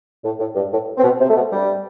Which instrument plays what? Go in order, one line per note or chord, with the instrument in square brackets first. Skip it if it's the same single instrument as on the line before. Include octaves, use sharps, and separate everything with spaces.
[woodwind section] A2
A2
G2
A2
C4
B2 B3
C3 C4
A3
B2 B3
G2 G3